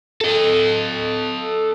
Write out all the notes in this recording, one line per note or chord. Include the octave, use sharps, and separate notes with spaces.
A4 D#5